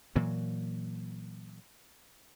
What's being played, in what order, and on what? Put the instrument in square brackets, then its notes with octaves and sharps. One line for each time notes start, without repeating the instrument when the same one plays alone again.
[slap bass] A#2 E3 F#3